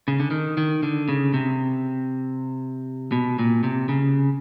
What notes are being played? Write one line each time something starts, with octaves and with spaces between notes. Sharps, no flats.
C#3
D3
D#3
D#3
D3
C#3
C3
B2
A#2
C3
C#3